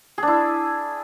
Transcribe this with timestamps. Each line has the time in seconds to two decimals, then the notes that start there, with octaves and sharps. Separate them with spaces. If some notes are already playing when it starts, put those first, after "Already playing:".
0.18 G#4
0.23 D4
0.27 E4